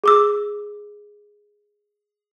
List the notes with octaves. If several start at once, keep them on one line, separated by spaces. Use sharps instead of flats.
G#4 D6 E6